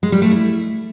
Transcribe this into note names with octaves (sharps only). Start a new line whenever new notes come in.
G#3
G3
A3
E4